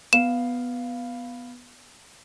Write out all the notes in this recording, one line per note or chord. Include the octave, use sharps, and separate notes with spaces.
B3 F5 E7